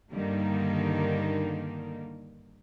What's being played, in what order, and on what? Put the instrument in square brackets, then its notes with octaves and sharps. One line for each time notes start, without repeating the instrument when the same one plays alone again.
[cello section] G2 D3 D#3 G3 A#3 D#4